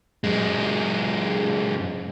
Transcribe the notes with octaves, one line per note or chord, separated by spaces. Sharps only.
F#2 G#3